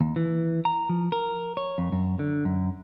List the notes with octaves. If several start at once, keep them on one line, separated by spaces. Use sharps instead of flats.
D#2
E3
A#5
F3
A#4
C#5
F2
F#2
D3
F#2